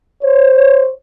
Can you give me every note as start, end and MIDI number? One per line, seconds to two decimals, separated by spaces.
0.23 0.90 72
0.23 0.90 73